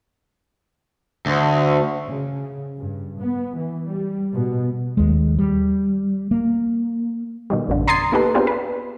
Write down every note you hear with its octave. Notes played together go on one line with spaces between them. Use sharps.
D2
C#3
G2
B3
E3
G3
B2
D#2 G#3
G3
A#3
B2 D#3 G3
A1 F#2 D3
A#5 C6 D#6 G#6 A6 C7
A#3 B3 D#4 G4 A4 B4
B3 C4 D4 F4 G4 G#4
B4